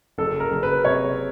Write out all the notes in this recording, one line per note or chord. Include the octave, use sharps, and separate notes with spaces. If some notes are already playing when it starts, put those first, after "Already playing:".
F#1 A4
A#4
F#1
B4
C3 C#5